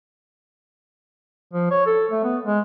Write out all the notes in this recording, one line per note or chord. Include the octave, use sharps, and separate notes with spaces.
F3
C#5
A4
A3
B3
G#3